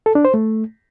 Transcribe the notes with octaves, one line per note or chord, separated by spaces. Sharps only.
A4
D4
C5
A3